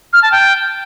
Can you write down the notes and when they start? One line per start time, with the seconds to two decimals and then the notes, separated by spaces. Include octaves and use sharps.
0.13 F6
0.23 A5
0.32 G5